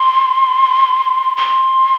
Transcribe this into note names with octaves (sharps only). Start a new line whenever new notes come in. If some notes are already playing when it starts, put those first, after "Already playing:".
Already playing: C6
C6